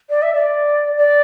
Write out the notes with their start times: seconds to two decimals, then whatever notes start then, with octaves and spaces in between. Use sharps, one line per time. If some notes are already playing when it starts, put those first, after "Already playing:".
0.10 D5
0.22 E5
0.34 D5
0.97 D5